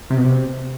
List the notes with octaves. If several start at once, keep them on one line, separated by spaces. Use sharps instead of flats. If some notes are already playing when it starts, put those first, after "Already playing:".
C3
B2
C3